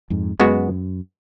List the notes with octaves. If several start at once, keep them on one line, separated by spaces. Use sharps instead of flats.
F2 G#2
F#2 G#3 B3 F#4